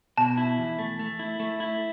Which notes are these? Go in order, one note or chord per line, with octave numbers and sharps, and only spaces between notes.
B2 A5
E4
E2
A3
A3
E4
A3
E4